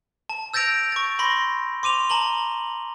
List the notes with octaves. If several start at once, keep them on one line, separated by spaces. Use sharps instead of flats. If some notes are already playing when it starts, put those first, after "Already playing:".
A5
E6 G6 A6 A#6 D7 F7
C#6 A6
B5 C6 A#6
C6 D6 D#7 F7
A5 A#5 F#7 G7